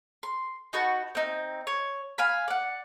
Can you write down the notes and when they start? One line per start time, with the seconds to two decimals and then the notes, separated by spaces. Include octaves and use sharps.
0.23 C6
0.73 D#4 F#4 B4 A5
1.15 C4 D#4
1.67 C#5
2.18 F5 G#5 B5
2.48 D5 F#5